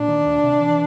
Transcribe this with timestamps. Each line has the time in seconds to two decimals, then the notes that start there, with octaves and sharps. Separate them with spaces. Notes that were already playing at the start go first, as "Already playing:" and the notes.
Already playing: A#2 D4
0.08 D#3
0.26 D2
0.43 C3
0.60 E3